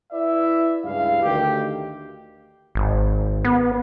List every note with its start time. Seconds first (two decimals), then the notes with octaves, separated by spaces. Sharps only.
0.12 E4 B4 D5 E5
0.85 C#2 G2 E4 G#4 F5
1.22 D2 D#3 G4
2.75 G#1
3.45 B3